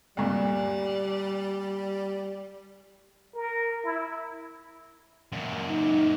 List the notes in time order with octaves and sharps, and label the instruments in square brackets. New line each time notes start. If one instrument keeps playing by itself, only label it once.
[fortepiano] D2 G2 A#2 [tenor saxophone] G3
[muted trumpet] A#4
E4
[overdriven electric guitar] F#2 A#2
[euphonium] D#4